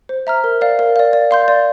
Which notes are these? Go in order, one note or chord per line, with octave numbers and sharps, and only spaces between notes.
C5
E5 A#5 F6
A#4
D5 F5
A#4
D5 F5
D5
F5 C6 G6
D5